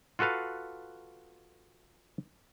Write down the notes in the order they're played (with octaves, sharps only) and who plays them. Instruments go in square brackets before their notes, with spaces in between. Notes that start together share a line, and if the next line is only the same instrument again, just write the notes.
[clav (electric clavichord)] F4 F#4 A4 B4 F5